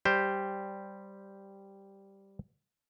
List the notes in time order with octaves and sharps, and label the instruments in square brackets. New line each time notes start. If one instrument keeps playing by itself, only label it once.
[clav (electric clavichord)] G3 G4 C5